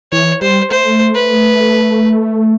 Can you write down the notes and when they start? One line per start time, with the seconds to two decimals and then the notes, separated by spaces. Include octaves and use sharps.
0.12 E3 C#5
0.42 G3 C5
0.71 A3 C5
1.15 B4